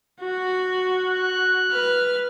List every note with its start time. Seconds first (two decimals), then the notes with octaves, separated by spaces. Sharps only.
0.20 F#4
1.07 F#6
1.71 B4 F6